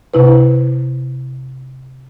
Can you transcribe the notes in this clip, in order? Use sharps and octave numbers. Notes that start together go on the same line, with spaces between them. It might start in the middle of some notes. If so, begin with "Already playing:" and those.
C3 E4 B4